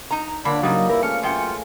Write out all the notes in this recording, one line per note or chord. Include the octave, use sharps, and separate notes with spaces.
D#4 A#5
D3 A#3 D4 F4 C#5 B5
C#3 F#3 G3 D#4
E4 A#4 B4
A3 C#4 G#4 F5 C#7
F#2 F4 G5